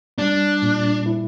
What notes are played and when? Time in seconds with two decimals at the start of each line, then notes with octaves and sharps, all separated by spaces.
0.18 G3 D4
0.62 A#2
1.06 E4